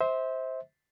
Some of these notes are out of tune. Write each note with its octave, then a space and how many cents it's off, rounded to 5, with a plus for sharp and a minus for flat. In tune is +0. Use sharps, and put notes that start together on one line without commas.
C5 +0 E5 -30